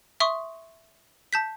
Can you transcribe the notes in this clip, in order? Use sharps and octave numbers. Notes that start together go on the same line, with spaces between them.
E5 C6 C#6 D#6
A5 G6 B6